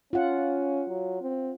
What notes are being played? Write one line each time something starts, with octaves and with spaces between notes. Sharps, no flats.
C#4 F4 F#5
F#3
C4